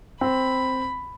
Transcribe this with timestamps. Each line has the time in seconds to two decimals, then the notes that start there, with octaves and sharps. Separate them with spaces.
0.21 C4 B5